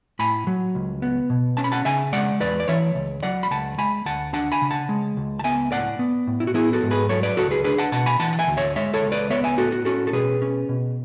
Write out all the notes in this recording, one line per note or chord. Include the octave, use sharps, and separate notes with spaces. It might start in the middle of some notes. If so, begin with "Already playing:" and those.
A2 G#5 B5
F#3
C#2
B3
B2
C#4 A5
B5
F#5 A5
C#3 E5 G#5
G#3 D5 F#5
E2 B4 D5
D5
E3 C#5 E5
C#2
F#3 D5 F#5
B5
C#2 F#5 A5
G#3 G#5 B5
D2 F#5 A5
D4 F#5 A5
G#5 B5
C#3
F#5 A5
G#3
C#2
A5
B3 E5 G#5
A2 D5 F#5
B3
A2
E4
F#4
B3 E4 G#4
F#4 A4
G#2
G#4 B4
F#3 A4 C#5
B4 D5
C#2 F#4 A4
G#4 B4
D4 G#4 B4
F#5 A5
B2 F#5 A5
G#5 B5
E3 F#5 A5
F#5
E5 G#5
D2
C#5 E5
G#3 C#5 E5
A4 C#5
C#2
B4 D5
B3 C#5 E5
E5 G#5
A2 F#4 A4
F#4
C#4 F#4 A4
A4
B2 G#4 B4
C#4
B2